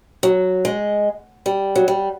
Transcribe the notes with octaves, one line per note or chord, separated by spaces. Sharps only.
F#3
G#3
G3
F#3
G3